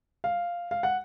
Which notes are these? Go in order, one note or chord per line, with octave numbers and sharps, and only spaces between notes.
F5
F5
F#5